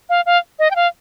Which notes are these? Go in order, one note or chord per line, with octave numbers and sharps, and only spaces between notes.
F5
F5
D#5
G5
F5